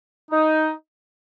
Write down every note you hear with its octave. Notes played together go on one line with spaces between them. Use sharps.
D#4